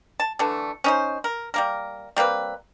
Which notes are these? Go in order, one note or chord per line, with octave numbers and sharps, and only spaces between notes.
A5
D3 E3 A3 A4
C#4 D#4 C5
A#4
G3 A#3 A#4
G3 A#3 C4 B4